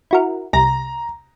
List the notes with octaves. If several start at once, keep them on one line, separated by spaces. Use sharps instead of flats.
E4 F#4 A#4
C2 A#5 A#6